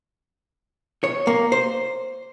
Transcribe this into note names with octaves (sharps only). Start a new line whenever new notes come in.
C#5
A#3
C5